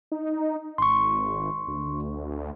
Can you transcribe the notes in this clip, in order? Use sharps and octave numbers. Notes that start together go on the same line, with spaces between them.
D#4
G#1 C6 C#6
D2